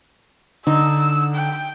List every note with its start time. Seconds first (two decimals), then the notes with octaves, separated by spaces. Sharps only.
0.67 D3 D#4 E6
1.34 G5